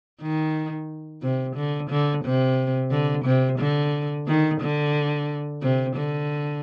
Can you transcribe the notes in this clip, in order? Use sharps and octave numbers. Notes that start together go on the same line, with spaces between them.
D#3
C3
D3
D3
C3
D3
C3
D3
D#3
D3
C3
D3